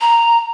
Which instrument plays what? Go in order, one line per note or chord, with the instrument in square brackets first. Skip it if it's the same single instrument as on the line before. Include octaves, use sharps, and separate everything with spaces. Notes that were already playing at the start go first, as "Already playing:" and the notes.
[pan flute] A#5